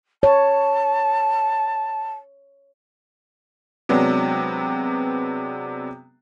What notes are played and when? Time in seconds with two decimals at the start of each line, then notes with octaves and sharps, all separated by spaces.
0.23 C#5 A5
3.89 C3 F#3 G#3 B3 D4